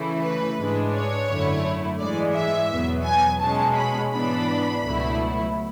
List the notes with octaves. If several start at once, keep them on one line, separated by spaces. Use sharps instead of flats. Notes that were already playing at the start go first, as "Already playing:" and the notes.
Already playing: C#3 E3 A3 E4
B4
G#2 G#3 D4
C#5
F#2 D3 A3 E4
G#2 E3 G#3 D5
E5
E2 B2 F#3 B3
G#5
B2 G#3 C#4 A5
B5
G#2 E3 B3 D4 B5
C#2 B2 F#3 A3 E4